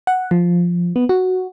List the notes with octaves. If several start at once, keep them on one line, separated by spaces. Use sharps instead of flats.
F#5
F3
B3
F#4